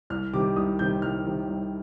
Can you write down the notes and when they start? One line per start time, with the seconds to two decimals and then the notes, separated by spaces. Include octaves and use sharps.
0.10 C2 F6
0.33 C3 D#3 G3 D6
0.56 C2 D#6
0.79 C3 D#3 G3 G6
1.02 C2 F6
1.26 C3 D#3 G3
1.49 C2